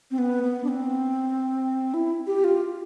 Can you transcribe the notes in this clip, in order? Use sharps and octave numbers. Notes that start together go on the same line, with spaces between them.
C4
B3
B3
D4
C4
E4
G4
F4